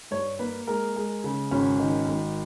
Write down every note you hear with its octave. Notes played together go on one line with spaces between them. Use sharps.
G2 C#5
A#3 B4
G#3 A#4
G#3
C#3
G#1 C#4
D#3
G#1